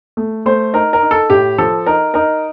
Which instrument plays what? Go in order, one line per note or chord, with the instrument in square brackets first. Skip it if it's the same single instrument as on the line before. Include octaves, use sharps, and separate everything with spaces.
[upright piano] A3
A3 C5
D#4 A#4
A#4
D#4
A4
A2 G4
F3 A4
D#4 A#4
D#4 A#4